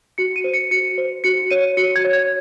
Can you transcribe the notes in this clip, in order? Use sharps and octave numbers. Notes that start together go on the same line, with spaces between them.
F#4 C#7
D#7
C5
C#7
F#4 C#7
C5
F#4 C#7
C#5 D#7
F#4 C#7
G#6
C#5
G#6